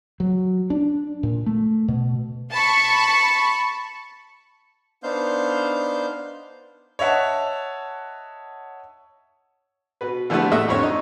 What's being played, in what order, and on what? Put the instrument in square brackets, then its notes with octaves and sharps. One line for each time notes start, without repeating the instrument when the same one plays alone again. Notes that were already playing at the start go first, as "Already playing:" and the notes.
[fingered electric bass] F#3
D4
A#2
A3
B2
[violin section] A5 B5 C#6
[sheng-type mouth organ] B3 D4 D#4 C5 F5 G6
[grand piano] C#5 D#5 E5 F#5 A5
[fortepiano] B2 B4
D3 E3 F3 G3 A3 B3
A1 A3 D#5 E5 F#5
A1 F2 D3 C#5 C#6
D#4